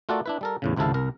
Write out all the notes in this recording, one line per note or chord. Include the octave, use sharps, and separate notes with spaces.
A3 F4 F#4 A4 A#4 D5
D4 E4 B4
G3 A4 A#4
E2 A2 C#3
G#1 C#2 C3 E4 A4 F5
C2 A#4 A#5